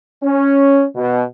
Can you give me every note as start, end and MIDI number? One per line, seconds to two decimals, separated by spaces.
0.23 0.83 61
0.95 1.22 47